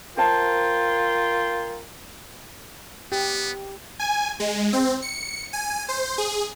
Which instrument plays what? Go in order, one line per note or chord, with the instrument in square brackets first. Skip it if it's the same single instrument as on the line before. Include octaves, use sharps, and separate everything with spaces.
[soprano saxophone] F4 [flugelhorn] A#4 [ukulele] C5 F5 A5 [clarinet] G5
[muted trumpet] B3 [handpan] G4
[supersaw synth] G#5
G#3
C4
C#7
G#5
C5
G#4